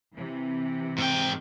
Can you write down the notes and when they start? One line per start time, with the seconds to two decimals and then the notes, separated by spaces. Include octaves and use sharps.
0.15 C3 E3
0.98 G#2 G5